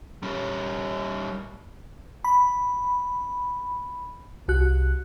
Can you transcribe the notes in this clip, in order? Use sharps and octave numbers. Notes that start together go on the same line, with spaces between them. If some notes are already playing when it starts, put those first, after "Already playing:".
G3 C#4
B5
C2 F#4 F#6